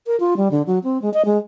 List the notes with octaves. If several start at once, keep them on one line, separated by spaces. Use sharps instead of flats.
A#4
F4
G3
D3
F#3
C4
G#3
D#5
G#3